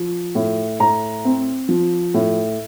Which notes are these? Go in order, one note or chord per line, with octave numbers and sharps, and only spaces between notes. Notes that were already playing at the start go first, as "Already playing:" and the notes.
Already playing: F3
A2
A2 A#5
C4
F3
A2